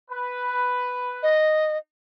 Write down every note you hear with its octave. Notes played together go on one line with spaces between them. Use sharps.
B4
D#5